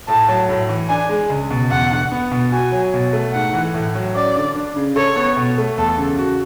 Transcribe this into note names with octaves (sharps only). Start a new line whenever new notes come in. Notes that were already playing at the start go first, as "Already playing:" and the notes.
A2 A5
F#3
A2
E3
D4 G#5
G#3
C#2
B2
E2 F#5
D3
B3
B2
F#4 G#5
F#3
B2
A3
G#2 F#5
E3
A2
F#3
C#4 D5
D3
D4
C#3
A4 C#5
B3
B2
A3
E2 A4
C#3
F#4